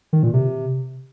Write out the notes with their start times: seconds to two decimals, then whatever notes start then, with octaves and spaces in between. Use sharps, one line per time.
0.13 D#3
0.23 A#2
0.33 C3